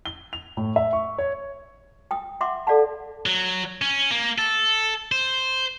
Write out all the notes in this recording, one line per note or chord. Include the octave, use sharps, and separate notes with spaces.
G7
F7
A2
E5
C#6
C#5
G5 D#6
E5 F#5 C6 D6
A4 D5 F5 F#5 A5
F#3
C#4
A#3
A4
C5